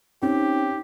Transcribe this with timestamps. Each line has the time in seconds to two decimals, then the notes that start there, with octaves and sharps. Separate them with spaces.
0.22 C4 C#4 D#4 G4